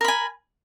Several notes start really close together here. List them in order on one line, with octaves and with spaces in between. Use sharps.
A#4 B5 G#5